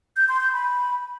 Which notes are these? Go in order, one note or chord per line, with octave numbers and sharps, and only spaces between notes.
G6
C6
G6
B5